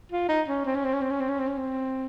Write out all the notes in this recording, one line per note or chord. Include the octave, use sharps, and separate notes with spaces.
F4
D#4
C#4
C4
C#4
C4
C#4
C4
C#4
C4
C#4
C4
C#4
C4